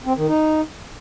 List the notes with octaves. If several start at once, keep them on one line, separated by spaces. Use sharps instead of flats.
C4
D#3
D#4